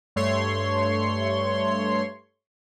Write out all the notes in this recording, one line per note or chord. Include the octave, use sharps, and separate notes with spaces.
G2 A3 C#5 C6